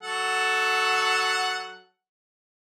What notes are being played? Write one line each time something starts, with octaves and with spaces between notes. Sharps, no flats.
F#3 A4 F#5